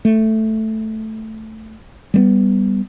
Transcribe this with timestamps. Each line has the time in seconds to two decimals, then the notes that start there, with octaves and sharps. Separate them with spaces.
0.05 A3
2.14 G3 A3 B3